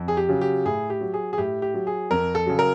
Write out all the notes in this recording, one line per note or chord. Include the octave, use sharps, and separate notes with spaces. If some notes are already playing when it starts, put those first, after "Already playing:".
Already playing: F2
G#4
G4
C#3 F#3
G4
A2 G#4
G4
F#3
G#4
G#4
A2 G4
G4
F#3
G#4
F2 A#4
A4
C#3 F#3
A#4